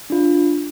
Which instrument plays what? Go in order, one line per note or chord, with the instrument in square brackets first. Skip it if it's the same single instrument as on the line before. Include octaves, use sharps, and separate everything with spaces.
[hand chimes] D4 F4